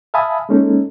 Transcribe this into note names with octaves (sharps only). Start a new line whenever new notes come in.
E5 F5 G#5 A5 B5 D#6
G#3 A#3 C#4 D#4 A4